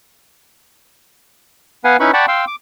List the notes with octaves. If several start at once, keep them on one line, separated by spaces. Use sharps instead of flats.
B3 B4 F5 F#5 G#5
C#4 D#4 E4 B4 B5 C#6
D5 F#5 G5 A5 B5 C#6
F5 G5 C6 E6
D6